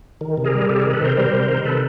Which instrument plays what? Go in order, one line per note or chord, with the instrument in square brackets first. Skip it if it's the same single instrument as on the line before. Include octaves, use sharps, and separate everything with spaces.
[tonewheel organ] D#3
C3
G#4 A#4
G3
C3 G4 A4
D#3 G#4 A#4
A4 B4
C3 A#4 C5
G3 A#4 C5
C3
D#3
C3 A4 B4